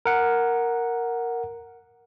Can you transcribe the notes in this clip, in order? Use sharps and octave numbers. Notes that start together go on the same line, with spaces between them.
A#4 F#5